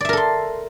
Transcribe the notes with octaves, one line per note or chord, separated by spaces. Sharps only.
A4 A#4 D5 E5 C6